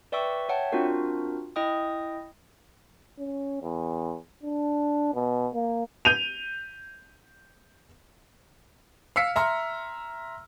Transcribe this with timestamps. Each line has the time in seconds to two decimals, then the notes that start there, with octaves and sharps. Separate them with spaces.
0.12 B4 D5 E5 G5 C#6 E6
0.49 C#5 E5 F#5 G5 A5
0.72 C4 D4 F4 F#4 A#4
1.56 E4 D#5 G5 D#6
3.19 C#4
3.62 E2
4.43 D4
5.14 B2
5.54 A#3
6.05 G6 D#7 F7
9.16 F5 E6 F6 B6 C#7
9.36 E5 A#5 C6 F6